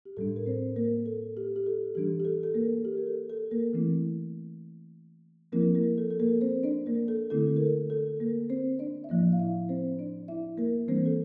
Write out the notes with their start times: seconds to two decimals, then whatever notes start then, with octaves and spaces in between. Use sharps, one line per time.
0.05 G4
0.17 A2 G3 D4 A4
0.36 A#4
0.46 C4 C5
0.76 A#3 A#4
1.06 A4
1.37 G4
1.56 G4
1.66 A4
1.95 E3 G3 D4 G4
2.20 G4
2.25 A4
2.43 A4
2.55 A#3 A#4
2.85 G4
2.97 A#4
3.07 A4
3.30 A4
3.51 A#3 A#4
3.74 E3 A3 C4 E4
5.52 F3 A#3 C4 E4 A#4
5.75 A#3 A#4
5.98 A4
6.11 A4
6.20 A#3 A#4
6.41 C4 C5
6.63 D4 D5
6.86 A#3 A#4
7.08 A4
7.30 D3 A3 C4 E4 A4
7.56 A#4
7.61 A4
7.90 A4
8.20 A#3 A#4
8.50 C4 C5
8.79 D4 D5
9.04 E5
9.09 A2 F3 A#3 D4 E4 D5
9.32 F5
9.39 E4 E5
9.69 C4 C5
9.99 D4 D5
10.28 E4 E5
10.58 A#3 A#4
10.88 E3 G3 A#3 C4 D4 C5
11.05 A4